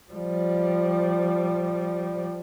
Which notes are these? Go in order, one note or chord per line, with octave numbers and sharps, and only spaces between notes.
F3 G3